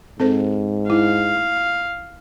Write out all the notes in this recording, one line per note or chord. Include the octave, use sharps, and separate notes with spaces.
G#2 C4 A4 C5
E4 F5